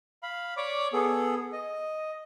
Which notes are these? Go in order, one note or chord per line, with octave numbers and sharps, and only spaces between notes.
F5 B5
C#5 D5 D6
B3 G#4 A4
D#5